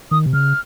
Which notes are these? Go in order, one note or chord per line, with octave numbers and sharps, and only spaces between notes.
D#3 D#6
C3
C#3 F6